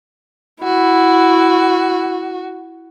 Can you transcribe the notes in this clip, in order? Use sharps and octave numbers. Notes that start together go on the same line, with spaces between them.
E4 F#4